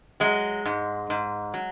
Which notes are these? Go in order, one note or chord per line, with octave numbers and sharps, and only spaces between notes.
F#3 G#3
G#2
G#2
F#3